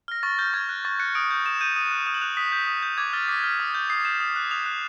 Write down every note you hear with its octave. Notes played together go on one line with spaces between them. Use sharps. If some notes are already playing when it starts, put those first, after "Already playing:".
F6 A#6
C#6 A6
F6 G6
C#6 G#6
F#6
C#6 A6
F#6 C#7
D#6 D7
G6
D#6 E7
G6 D#7
D#6 D#7
F#6
D#6 E7
F#7
F#6 F7
D#6 B6
G6
D#6
G6
D6 G#6
F6 A6
D6 B6
F6
D#6
G6
D#6 C7
G6 E7
D#6
F#6
D#6 F7
F#6